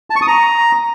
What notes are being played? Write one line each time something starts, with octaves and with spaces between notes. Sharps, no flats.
A5
C#6
D#6
A#5